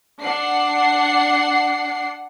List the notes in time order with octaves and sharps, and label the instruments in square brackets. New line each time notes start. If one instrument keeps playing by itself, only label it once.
[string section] D4 F#5 C7